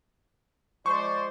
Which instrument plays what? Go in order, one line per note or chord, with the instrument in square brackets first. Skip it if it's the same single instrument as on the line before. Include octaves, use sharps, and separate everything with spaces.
[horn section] F3 G#3 C5 [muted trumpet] D5 [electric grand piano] C#6